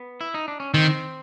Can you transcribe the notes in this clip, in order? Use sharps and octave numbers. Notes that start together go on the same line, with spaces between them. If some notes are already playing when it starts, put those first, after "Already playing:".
Already playing: B3
E4
D#4
D4
C#4
D#3 C4